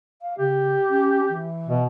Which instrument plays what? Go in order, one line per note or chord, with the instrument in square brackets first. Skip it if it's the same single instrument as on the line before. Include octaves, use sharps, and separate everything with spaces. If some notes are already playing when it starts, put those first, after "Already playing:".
[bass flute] F5
[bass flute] C#3 [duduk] G4
[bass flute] C#4
E3
[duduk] B2